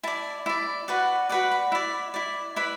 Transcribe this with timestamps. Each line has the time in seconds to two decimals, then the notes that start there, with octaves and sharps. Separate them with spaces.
0.03 E4 D5 A5
0.46 E4 D5
0.88 F#4 B4 D5 F#5
1.29 F#4 B4 D5 F#5
1.51 B5
1.72 E4 D5
2.14 E4 D5
2.56 E4 B4 D5 B5